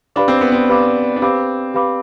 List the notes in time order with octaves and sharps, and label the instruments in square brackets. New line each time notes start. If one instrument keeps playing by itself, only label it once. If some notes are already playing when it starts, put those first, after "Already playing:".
[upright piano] D4 [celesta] G4 B4 F5 B5 D6
[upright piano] C4
B3
C4
[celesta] G4 B4 F5 B5 D6
[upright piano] D4
[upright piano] C4 [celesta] G4 B4 F5 B5 D6
[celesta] G4 B4 F5 B5 D6